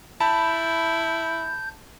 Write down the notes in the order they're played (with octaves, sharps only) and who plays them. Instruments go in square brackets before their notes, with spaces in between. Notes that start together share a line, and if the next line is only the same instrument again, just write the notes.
[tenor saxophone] E4 [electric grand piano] A5 [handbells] B5 [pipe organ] G6